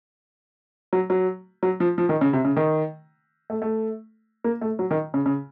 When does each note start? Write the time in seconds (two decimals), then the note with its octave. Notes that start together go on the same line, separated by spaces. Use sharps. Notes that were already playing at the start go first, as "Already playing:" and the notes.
0.93 F#3
1.10 F#3
1.63 F#3
1.80 F3
1.98 F3
2.09 D#3
2.21 C#3
2.33 C3
2.45 C#3
2.57 D#3
3.50 A3
3.62 A3
4.44 A#3
4.61 A3
4.79 F#3
4.91 D#3
5.14 C#3
5.26 C#3